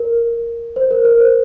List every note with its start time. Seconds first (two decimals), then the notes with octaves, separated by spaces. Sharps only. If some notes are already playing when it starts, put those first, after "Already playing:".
Already playing: A#4
0.76 C5
0.91 A#4
1.05 A#4
1.20 C5